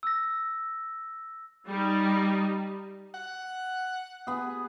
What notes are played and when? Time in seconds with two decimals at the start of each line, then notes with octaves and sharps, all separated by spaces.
0.03 E6 A#6
1.66 G3 D#4
3.14 F#5
4.27 B3 G#4